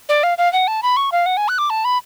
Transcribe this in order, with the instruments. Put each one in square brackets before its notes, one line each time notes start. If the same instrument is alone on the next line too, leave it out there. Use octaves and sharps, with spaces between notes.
[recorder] D5
F5
F5
F#5
A5
B5
C#6
F5
F#5
G#5
F#6
D6
A5
B5